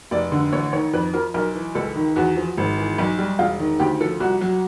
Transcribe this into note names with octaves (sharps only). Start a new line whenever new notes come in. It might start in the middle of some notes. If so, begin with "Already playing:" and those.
F1 D5
D3
A1 C#5
D#3 C#5
F2 B4
F3 A#4
B1 A#4
E3
C#2 A4
D#3
E2 F#4
F3
G#1
E3
B1
G3
E1 F4
D#3
D2 G4
F3 A4
C2 F#4
F#3